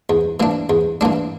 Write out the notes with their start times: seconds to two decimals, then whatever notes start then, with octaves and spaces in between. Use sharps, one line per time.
0.10 E2
0.40 E3 A#3 D4
0.70 E2
1.01 E3 A#3 D4